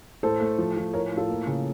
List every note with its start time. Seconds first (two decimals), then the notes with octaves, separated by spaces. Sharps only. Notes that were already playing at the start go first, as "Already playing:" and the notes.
0.23 A2 A4 C5
0.41 A3
0.58 F3
0.77 F3
0.94 A2 A#4 C#5
1.12 A2
1.17 F4 A4
1.29 A#3
1.47 C#3